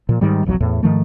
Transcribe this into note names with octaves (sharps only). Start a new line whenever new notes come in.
A#2 F3
G#2 D#3 G3
F#1 B1 F2 F#3
E2 A2
G#2 D#3 F3 A3